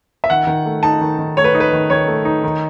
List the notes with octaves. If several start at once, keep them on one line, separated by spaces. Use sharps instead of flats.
E5
D#3 F#5
D#3
A3
D#4 A5
D#3
D#3
A3 C#5
B4
D#4
B4
D#3
D#3 C#5
A3
D#4
D#3